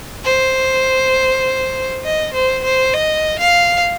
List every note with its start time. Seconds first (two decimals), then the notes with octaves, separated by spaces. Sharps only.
0.25 C5
2.04 D#5
2.34 C5
2.64 C5
2.94 D#5
3.39 F5